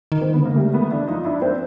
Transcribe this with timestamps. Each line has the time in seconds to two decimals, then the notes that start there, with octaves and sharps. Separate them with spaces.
0.12 D#3
0.22 C4
0.33 D3 B3
0.41 C#3
0.45 D3 A#3
0.56 C#3 G3 A3
0.73 D#3 A3 B3
0.90 E3 D4 E4
1.07 F3 D#4 F4
1.25 D4 E4
1.42 C4 D4